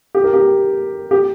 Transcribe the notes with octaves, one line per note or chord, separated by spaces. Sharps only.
G4
A#4
G4
G4